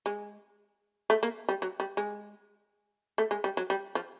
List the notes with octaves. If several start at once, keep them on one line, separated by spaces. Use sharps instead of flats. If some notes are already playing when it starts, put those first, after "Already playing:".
G#3
A3
A#3
G3
F#3
G3
G#3
A3
G#3
G3
F#3
G3
F3